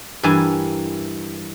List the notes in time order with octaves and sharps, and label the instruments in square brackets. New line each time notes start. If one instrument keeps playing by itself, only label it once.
[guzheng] G2 E3 A#4 G#5 A5